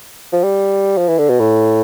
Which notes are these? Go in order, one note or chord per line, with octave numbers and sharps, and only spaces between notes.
F3
G3
F3
E3
D3
B2
A2